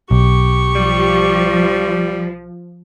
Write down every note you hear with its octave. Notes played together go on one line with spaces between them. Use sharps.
B1 G4 C#6
F3 G3